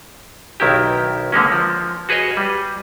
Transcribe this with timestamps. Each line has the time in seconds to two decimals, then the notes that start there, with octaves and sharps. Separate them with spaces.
0.60 B1 D#3 E4 G4
1.32 D3 G#3 A#3 C#4
1.52 F3
2.09 F#4 G#4 B4 C#5 D#5
2.37 G3